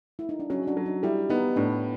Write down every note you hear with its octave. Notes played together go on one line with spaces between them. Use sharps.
E4
D#4
D4
F#3 C#4
D4
F#3
D#4
G3 E4
B3 D#4
A2 D4